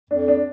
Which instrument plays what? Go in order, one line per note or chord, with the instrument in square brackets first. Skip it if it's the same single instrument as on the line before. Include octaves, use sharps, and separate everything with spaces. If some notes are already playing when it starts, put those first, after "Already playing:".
[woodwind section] F2 [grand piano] D4
[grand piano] D4